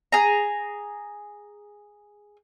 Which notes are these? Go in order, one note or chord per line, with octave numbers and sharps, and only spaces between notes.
G#4 A#5